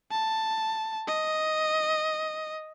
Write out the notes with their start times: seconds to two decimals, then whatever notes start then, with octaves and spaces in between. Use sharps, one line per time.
0.11 A5
1.08 D#5